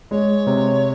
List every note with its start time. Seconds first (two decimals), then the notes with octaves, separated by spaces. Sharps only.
0.10 G#3 C#5
0.47 C3